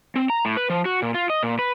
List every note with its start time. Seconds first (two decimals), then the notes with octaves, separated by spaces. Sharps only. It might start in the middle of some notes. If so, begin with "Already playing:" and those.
0.16 C4
0.30 A#5
0.45 A2
0.57 B4
0.70 F3
0.85 F#4
1.02 A#2
1.14 F4
1.30 D#5
1.43 A#2
1.59 B4